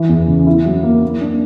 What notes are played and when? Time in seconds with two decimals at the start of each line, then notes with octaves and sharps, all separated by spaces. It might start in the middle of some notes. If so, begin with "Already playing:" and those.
Already playing: E3
0.09 E2
0.27 C#3
0.47 E4
0.65 F#3
0.83 A#3
1.03 A#3
1.21 D4